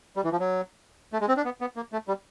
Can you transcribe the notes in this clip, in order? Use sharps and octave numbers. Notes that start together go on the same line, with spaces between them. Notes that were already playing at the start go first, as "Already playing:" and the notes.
G3
E3
F3
F#3
A3
G#3
C4
D4
B3
B3
A#3
A3
G3